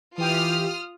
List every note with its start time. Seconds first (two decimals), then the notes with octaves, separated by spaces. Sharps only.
0.18 E3 F4 G4 D#6 F6